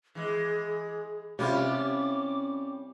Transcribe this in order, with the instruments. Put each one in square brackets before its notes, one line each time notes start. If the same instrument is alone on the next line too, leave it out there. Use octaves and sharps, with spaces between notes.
[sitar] E3 G#3 [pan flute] G#4
[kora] C3 E4 F4 [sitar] G3 C#4 [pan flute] D6